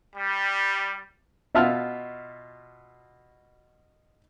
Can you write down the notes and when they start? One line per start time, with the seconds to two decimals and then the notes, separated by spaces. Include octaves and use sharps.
0.16 G3
1.55 B2 F4 E5 A5 F6